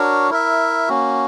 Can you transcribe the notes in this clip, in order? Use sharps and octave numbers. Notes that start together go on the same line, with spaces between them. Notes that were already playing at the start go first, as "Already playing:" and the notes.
Already playing: D4 F#4 A#4 C#5
E4 A#4 E5
A#3 C#4 F#4